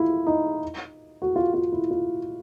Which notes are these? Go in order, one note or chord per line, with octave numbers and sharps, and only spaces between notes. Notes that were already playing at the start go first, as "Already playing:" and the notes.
Already playing: E4 F4
D#4
F#4
F4
F4
E4
F4